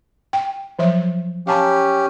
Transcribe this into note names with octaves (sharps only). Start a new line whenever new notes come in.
G5
F3 F#3 E5
C#4 G4 F5 A5 A#5